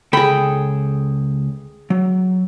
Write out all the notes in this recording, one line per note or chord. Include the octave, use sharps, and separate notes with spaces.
C#2 G#4 A4 G5 B5
F#3